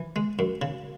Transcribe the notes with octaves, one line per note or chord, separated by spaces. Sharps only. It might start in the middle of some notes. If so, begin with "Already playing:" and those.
Already playing: E3
G#3
F#2
C#3